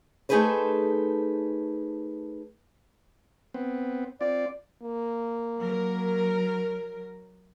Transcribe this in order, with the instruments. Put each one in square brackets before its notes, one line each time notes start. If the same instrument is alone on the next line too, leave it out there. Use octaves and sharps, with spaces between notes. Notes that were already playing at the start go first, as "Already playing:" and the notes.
[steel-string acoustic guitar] A3 D#4 G#4 A4 B4 C5
[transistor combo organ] B3 C4
[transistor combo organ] C4 F4 [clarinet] D5
[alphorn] A#3
[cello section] F#3 A#4